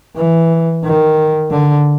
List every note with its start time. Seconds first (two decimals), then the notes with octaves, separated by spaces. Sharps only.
0.16 E3
0.84 D#3
1.51 D3